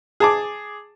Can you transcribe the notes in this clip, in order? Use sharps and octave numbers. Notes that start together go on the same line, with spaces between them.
G#4 A5 D6